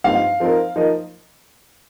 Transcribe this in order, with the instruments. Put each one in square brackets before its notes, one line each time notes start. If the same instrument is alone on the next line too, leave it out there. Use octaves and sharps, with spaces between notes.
[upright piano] G2 F3 C4 D#4 [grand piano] F5
[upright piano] F3 C4 D#4 A#4
F3 D#4 A#4 D#5